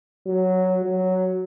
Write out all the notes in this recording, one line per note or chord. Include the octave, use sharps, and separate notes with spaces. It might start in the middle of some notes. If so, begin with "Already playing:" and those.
F#3
F#3